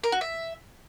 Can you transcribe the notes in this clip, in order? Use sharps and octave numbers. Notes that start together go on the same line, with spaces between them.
A#4
F#4
E5